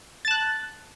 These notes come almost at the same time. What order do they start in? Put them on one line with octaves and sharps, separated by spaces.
A6 A5 F#6